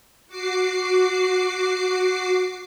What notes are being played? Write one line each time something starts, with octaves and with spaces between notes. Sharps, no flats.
F#4 D6 C7